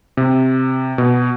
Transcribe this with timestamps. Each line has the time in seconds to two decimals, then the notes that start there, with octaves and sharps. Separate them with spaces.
0.17 C3
0.98 B2